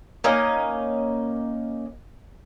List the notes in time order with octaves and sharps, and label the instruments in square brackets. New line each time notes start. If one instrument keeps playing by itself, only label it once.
[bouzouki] A#3 C#4 D#4 D#5